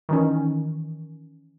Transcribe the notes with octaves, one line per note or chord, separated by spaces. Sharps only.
D#3 E3 C#4